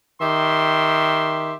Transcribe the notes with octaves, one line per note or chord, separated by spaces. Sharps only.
D#3 G4 E5 C6